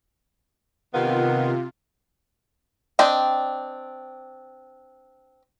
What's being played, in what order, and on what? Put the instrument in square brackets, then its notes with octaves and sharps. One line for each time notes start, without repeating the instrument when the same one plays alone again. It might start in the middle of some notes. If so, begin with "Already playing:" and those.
[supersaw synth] C3 F4 [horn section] D#3 B3
[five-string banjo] C4 D4 D#5 G5